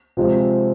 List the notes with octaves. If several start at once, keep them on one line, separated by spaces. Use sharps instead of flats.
C3 F3 G#3 C4 F4